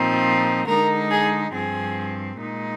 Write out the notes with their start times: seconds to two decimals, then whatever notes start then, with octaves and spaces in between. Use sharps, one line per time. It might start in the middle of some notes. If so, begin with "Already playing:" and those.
Already playing: A#2 F3 C4 D#4
0.67 D3 G#3 D#4 A#4
1.10 G#4
1.53 G2 F3 C4 G#4
2.39 A#2 G#3 D#4